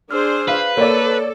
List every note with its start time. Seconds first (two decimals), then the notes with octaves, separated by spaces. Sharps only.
0.11 D4 G#4 C5 E6 F6
0.48 B4 F5
0.77 A#3 A4 C#5 D5